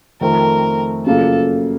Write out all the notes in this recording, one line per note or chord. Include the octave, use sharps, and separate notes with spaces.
F2 D#3 A3 C4 A#4
F#2 C#3 F3 A#3 A4